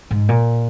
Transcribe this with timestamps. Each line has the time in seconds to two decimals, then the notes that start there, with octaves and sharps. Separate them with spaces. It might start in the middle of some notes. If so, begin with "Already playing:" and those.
0.11 G#2
0.29 A#2